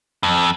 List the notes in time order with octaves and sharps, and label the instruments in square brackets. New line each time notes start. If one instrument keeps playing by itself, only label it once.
[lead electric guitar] F2